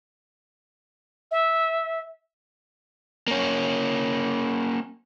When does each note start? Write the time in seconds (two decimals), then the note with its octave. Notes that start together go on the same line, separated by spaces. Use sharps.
1.31 E5
3.28 A#3 C#4